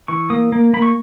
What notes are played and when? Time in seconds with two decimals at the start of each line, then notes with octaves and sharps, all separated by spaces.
0.08 E3 C#6
0.30 A#3 D#6
0.52 A#3
0.73 A#3 B5
0.82 C#6